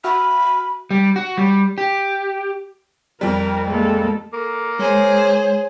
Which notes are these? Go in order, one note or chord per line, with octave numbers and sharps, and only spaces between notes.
F#4 E5 B5 F6
G3
F#4
G3
G4
F2 G3 A#4
G#3 A#3 A4
A#3 A4
G#3 G#4 C5 C#5